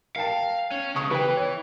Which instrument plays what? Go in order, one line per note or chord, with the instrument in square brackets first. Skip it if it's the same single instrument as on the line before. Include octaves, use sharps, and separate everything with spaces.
[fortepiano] A#4 G5 A5 [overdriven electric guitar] F5
[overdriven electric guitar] C#4
[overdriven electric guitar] C#2 C#3 [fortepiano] C#6 D#6
[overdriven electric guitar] E3 [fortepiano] B4 G5
[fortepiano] C#5